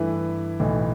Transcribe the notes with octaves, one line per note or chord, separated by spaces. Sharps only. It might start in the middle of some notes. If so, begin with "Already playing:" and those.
Already playing: G2 E3 A3 E4 B4
B1 A2 E3